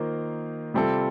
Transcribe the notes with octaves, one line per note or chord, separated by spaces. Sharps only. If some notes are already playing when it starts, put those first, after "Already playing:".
Already playing: D#3 A#3 F4 C5
C3 G3 C4 F4 A4